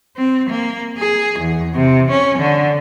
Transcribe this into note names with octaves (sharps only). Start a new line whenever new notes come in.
C4
A#3
G#4
E2
C3
C#4
D3